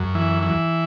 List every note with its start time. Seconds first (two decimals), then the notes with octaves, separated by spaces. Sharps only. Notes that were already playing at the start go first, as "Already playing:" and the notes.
Already playing: F#2
0.15 E3
0.43 E3